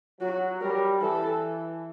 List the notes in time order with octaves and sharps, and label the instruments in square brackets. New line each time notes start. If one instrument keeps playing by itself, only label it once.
[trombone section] F#3 [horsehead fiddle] F#4
[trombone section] G3 [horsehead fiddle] A#4
[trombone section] E3 [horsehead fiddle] A4